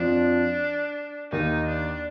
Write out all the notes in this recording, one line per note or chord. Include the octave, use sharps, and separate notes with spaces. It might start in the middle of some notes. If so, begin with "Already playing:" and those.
Already playing: F2 F3 D4
D#2 D#3 D#4
D4